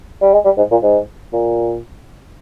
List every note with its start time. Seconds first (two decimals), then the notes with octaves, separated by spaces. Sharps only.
0.22 G3
0.33 G#3
0.45 G3
0.58 G#2
0.71 A#2
0.83 G#2
1.33 A#2